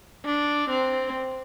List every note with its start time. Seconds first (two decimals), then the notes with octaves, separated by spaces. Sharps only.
0.25 D4
0.70 C4